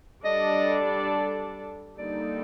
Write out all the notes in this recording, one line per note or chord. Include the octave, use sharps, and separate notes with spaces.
G3 D4 A4 D5 D#5
D3 G3 A#3 D#4 A4 D5